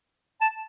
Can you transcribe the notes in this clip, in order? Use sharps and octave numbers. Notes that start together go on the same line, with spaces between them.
A5